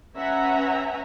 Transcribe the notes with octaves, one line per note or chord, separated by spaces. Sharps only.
C#4 B4 E5 F#5 G#5 A#5